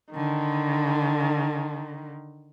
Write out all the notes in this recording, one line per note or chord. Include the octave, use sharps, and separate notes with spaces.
D3 D#3